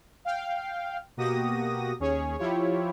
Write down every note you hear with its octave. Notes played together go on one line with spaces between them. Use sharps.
F5 G5
B2 A#3 F#4 G4 D#6 A#6
D#2 C#4 G#4 C#5
F3 E4 F4 G4 C#5